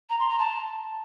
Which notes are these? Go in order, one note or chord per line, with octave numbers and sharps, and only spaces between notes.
A#5
C6
A#5
A5